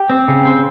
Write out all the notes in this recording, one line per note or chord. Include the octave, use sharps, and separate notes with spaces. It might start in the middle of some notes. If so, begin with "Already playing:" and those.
Already playing: G4
C4
C#3
C4